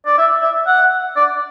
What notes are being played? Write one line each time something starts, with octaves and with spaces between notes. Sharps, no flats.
D5
E5
E5
F#5
D5